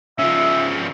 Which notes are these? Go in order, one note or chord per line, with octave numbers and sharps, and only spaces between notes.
C#3 F3 E5